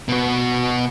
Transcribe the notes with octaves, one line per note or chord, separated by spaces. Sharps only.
B2 F#4